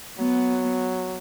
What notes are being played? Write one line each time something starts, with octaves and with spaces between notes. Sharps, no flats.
F#3 B3